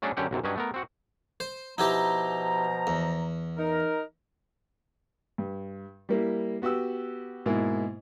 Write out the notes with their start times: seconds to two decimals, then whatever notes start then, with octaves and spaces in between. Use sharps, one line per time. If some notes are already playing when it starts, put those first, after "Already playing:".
0.02 F#3 A3 C#4 D4 G#4 A4
0.17 F#2 D3 C#4 G4 F#5
0.31 B1 F#2 C3
0.44 G2 F#3 C#4 B4 D#5 G#5
0.56 A3 B3 A#4
0.74 C4 F#4 F#5
1.40 C5
1.78 B2 F3 D#4 E4 G4 A#5
2.87 E2
3.58 D#4 A#4
5.38 G2
6.09 G3 A#3 E4
6.62 B3 F#4 G4 F#5 E6
7.46 G#2 B2 A#3 E4